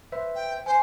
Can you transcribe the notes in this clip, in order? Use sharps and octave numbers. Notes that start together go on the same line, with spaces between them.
B4 C5 E5
G5
C5 G#5